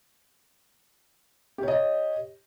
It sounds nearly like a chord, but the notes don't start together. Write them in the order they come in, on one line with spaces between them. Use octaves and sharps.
G4 C#5 D#5